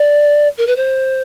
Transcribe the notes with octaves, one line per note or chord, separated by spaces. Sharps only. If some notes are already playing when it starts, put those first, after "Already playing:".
Already playing: D5
A#4
B4
C5